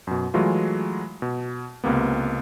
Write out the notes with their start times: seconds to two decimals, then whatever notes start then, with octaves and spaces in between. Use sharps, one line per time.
0.07 F#2 B2
0.34 E3 F#3 G#3 A3 F4
1.22 B2
1.84 C#2 C3 A#3 B3